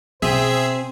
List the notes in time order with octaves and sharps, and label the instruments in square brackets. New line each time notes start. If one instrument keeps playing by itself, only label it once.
[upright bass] B2 [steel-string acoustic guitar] C4 G5 [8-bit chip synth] G#4 E5 [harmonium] C5